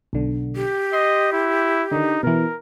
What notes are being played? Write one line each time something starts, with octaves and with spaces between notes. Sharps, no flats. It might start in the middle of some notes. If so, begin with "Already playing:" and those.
B1 D3
G4
D#5 C6
E4
D3 D#3 D#4
B2 E3 A#4